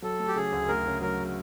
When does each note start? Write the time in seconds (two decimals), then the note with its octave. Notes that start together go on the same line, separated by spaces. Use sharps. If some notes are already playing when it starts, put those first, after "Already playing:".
0.02 F#3 A4
0.19 A3
0.27 G4
0.36 C#3 G#4
0.52 D2
0.68 D2 A#4
0.85 C#3
1.02 F#3 A#4